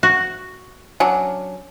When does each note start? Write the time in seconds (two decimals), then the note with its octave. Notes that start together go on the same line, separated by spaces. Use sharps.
0.03 F#4
1.00 F#3 C#4 D4